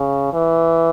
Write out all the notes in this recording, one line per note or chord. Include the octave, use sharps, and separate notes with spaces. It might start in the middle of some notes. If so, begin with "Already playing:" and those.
Already playing: C#3
E3